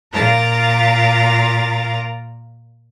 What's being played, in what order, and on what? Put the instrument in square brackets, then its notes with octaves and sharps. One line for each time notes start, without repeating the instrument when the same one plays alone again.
[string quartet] A#2 F4 A#4 A#5 D6 A6